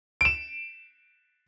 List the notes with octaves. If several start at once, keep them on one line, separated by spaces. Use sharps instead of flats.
D7 E7